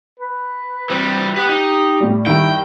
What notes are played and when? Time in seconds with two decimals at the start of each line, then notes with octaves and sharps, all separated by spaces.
0.20 B4
0.90 E3 G3 C4
1.36 G4 B4 F#5
1.49 D#4
2.01 A2 G3
2.26 G2 D#3 E4 G5